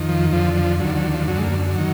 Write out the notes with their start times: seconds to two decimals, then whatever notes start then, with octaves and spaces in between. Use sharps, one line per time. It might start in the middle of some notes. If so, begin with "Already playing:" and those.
Already playing: F2 D#3
0.09 F3
0.33 F2 D3 F3
0.57 F3
0.80 D#2 D3 F#3
0.96 F#3
1.12 F3
1.27 F#2 D3 F#3
1.38 G#3
1.43 A#3
1.76 D#3 F#3